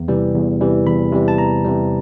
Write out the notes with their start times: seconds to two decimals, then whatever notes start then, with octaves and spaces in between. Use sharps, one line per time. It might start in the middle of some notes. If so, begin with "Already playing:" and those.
Already playing: E2
0.08 C3 E3 G3
0.35 E2
0.61 C3 E3 G3
0.86 E2 B5
1.12 C3 E3 G3
1.28 A5
1.38 E2 A#5
1.65 C3 E3 G3